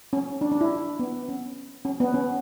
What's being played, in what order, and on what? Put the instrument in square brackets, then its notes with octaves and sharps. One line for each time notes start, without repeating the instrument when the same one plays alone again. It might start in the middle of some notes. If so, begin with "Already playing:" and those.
[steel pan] C#4
D4
D4
E4
B3
C#4
C#4
B3
C#4